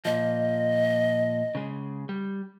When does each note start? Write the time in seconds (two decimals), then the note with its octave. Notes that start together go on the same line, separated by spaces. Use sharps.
0.05 A#2 F3 D#5
1.55 C#3 G#3
2.09 G3